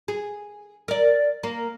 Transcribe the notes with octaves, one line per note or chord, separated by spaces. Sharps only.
G#4
A#4 D5
A#3